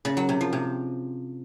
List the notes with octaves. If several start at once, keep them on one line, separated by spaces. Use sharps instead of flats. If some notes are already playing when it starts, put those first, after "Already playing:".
C#3
F#3
C3
F3
C3